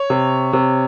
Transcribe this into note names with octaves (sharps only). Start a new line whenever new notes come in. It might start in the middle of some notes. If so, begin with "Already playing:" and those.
Already playing: C#5
C3
C3